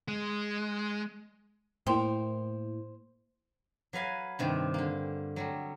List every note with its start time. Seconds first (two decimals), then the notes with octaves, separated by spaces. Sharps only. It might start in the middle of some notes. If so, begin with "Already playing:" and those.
0.08 G#3
1.87 A2 A3 A#3 E4 C5 G5 C6
3.93 F#3 B4 F5 G#5
4.39 G2 C3 D#3
4.74 D3 A#3
5.36 F#3 G3 A3